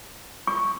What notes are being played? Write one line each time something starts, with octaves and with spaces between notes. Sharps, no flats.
C#6